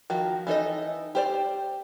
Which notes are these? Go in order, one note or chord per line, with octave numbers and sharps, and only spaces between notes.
D#3 F3 F#4
E3 D#4 A4 D#5
G4 C5 D5